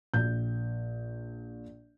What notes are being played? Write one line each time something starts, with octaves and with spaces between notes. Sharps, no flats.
A#1 G6